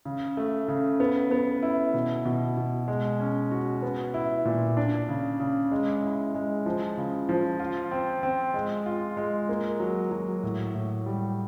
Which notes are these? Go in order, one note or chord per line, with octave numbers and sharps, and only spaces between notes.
C#3
A3
C#3
B3
B3
E4
B2
B2
B2
G#3
C#4
F#4
B3
E4
A#2
D4
C#3
C#3
G#3
E4
G#3
F3
C#3
F3
F4
C4
C4
G#3
F4
G#3
A#3
F#3
F#3
A2
A2
G3